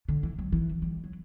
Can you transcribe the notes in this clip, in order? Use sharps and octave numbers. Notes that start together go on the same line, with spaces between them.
D3
E3
F#3
E3
G3
F#3